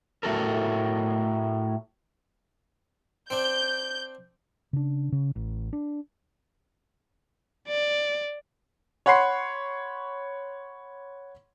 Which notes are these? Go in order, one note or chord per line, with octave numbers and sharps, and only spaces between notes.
A2 A3 F#4 A4 A#4
C4 D4 G6
C#3 D4
C#3
A1
D4
D5
C#5 F#5 B5 C6 C7